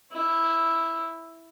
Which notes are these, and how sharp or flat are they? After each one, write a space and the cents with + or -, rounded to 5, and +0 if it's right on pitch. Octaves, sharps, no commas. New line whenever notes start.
E4 +0 C#5 -45